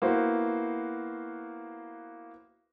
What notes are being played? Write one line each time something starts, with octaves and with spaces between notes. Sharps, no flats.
A#3 B3 E4 F#4 C5